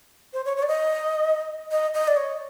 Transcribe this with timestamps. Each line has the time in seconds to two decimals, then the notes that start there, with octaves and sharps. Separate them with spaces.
0.33 C5
0.45 C#5
0.57 C#5
0.63 D5
0.68 D#5
1.71 D#5
1.94 D#5
2.08 D5
2.17 C#5